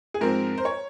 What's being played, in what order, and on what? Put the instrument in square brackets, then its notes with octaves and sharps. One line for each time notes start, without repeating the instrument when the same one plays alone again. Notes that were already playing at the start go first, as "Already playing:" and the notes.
[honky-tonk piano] G#4
G#2 F3 C4 A#4
C5
C#5